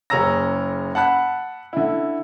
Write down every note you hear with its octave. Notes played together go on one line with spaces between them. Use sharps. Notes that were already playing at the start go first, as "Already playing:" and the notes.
F#1 C#3 C#4 A#5 E6 A#6
F#5 A5 B5 F#6
D3 E4